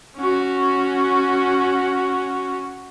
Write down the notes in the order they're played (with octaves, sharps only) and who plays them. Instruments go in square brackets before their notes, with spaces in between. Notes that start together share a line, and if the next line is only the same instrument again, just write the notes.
[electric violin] C#4 F#4